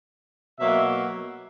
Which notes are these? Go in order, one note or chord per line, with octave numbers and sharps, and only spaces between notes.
B2 F#3 A#3 E5